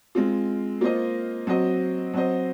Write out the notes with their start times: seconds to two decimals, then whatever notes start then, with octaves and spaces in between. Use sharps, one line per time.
0.15 G#3 C4 F4
0.81 A#3 F4 C5 D#5
1.47 F#3 C4 F#4 C5 D#5
2.14 F#3 C4 F#4 C5 D#5